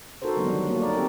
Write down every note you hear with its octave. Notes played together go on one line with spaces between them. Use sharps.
D#4 F#4 A4 A#4 C5
D3 D#3 F#3 G#3 B3 D4
D#3 G3 D4
A#3 C#4 F#4 A4
C#4 D#4 A#4 D5
C4 G4 A4